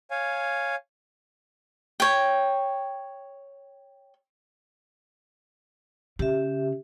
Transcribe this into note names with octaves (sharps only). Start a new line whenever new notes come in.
C#5 F5 G#5
C#5 G5
C#3 G4 E5